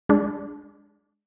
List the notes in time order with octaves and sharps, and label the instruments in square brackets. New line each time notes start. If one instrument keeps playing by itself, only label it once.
[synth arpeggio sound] G#3 D4